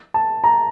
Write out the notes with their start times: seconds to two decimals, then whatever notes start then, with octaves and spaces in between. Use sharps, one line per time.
0.14 A5
0.44 A#5